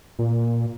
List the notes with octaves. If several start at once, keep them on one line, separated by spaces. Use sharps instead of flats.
A#2